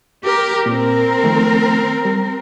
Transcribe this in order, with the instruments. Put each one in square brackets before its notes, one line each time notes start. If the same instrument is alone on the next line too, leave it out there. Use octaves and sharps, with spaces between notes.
[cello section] G4 A#4
[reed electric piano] A#2 [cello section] C4 A#4
[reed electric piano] D#3 F3 A3
G3